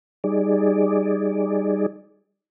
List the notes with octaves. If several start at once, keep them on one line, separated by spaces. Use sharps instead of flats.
G3 D#4 G#4 D5